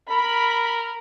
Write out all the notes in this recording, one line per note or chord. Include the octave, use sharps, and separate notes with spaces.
A#4 B5